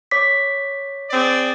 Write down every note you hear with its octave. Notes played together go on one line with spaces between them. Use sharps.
C#5 D6 B6
C4 G#4 D5